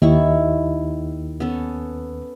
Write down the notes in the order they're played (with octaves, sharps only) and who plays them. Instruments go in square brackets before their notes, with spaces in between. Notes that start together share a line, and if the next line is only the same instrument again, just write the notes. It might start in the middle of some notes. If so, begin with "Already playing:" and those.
[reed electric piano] D#2 [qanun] D#3 E4 C#6
[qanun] B3 C#4 A4